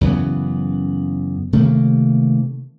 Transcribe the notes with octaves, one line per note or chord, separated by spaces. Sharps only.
F#2 C#3 E3 B3
C3 D#3 A3 A#3